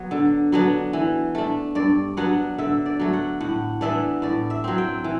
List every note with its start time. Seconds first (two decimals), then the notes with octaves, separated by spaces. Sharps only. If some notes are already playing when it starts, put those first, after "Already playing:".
Already playing: F#3 B3
0.11 D3
0.52 F#3 B3 D4
0.93 E3
1.35 A3 D4
1.75 G2 D5
2.17 F#3 B3 D4 F#5
2.58 D3 E5
2.86 D5
2.99 F#3 A3
3.13 F#5
3.40 A2 F#5
3.81 E3 B3 D4 E5
4.22 A2 D5
4.50 E5
4.64 F#3 C4
4.78 G5
5.04 E3